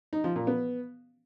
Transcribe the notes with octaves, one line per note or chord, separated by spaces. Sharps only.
D#4
F3
A#2
B3